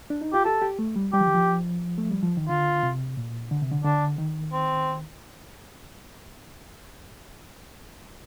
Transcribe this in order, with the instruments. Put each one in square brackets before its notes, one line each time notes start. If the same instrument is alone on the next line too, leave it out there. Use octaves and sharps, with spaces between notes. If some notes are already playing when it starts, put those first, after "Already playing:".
[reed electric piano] D4
D#4
[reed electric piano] F4 [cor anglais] G4
[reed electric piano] G4 [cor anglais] A4
[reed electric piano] G4
A3
G3
[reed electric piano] G3 [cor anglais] G4
[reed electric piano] F3
D#3
F3
A3
G3
F3
D#3
[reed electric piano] D3 [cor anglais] F4
[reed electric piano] C3
A#2
D3
C3
D3
[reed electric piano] D3 [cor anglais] D4
[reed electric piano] D#3
[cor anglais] C4